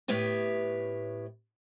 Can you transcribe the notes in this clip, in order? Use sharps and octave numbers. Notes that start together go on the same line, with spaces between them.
A2 B3 G4 B4 C#5 E5